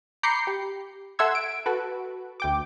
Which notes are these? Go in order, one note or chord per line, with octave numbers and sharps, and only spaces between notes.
A#5 B5 D6 G6 C7 C#7
G4
A4 E5 F#5 C6 E6 G#6
D7
F#4 A4 B4
D2 G5 D6